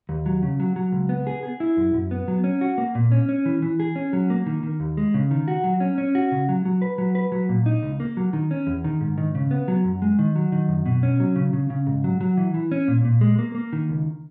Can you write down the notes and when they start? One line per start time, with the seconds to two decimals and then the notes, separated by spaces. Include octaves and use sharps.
0.09 D#2
0.26 F#3
0.43 C#3
0.60 F#3
0.76 F#3
0.92 C#2
1.09 B3
1.27 G#4
1.43 G#4
1.60 E4
1.77 F#2
1.94 F#2
2.11 B3
2.28 F#3
2.44 C#4
2.61 F#4
2.78 A#3
2.95 A#2
3.12 C#4
3.29 C#4
3.46 E3
3.62 E3
3.80 G#4
3.96 C#4
4.13 F#3
4.30 A#3
4.46 D#3
4.63 D#3
4.80 D#2
4.97 G#3
5.14 C#3
5.31 D#3
5.48 F#4
5.64 F#3
5.80 C#4
5.98 C#4
6.15 F#4
6.32 C#3
6.49 F#3
6.65 F#3
6.82 B4
6.98 F#3
7.15 B4
7.32 F#3
7.49 A#2
7.66 D#4
7.83 C#2
8.00 A#3
8.17 F#3
8.33 D#3
8.51 C#4
8.67 E2
8.84 D#3
9.01 G#2
9.18 D#3
9.35 C#3
9.51 B3
9.68 F#3
9.84 F#2
10.02 G#3
10.19 D#3
10.35 F#3
10.52 D#3
10.68 F#2
10.86 B2
11.03 C#4
11.20 F#3
11.36 C#3
11.53 C#3
11.70 C#3
11.87 G#2
12.04 F#3
12.21 F#3
12.37 E3
12.54 E3
12.72 C#4
12.88 A#2
13.05 A#2
13.21 G#3
13.39 A#3
13.55 A#3
13.73 D#3
13.89 C#2